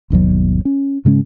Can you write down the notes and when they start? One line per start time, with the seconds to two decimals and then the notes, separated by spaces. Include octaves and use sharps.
0.10 G1 D#2 B2 F#3
0.65 C#4
1.05 G#2 C#3 G#3 C#4